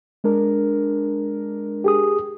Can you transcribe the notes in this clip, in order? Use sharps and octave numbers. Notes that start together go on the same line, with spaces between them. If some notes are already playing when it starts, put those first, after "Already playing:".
G#3 D4 A#4
G4 G#4 D#6